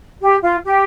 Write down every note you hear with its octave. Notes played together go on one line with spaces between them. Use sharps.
G4
F4
G4